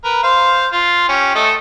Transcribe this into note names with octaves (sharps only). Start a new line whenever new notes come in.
A#4 B4
C5 F5
F4
C#4 G4
A3 A4 D#5